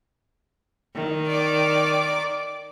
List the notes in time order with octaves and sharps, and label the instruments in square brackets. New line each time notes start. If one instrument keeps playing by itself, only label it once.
[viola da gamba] D#3
[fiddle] D5 D6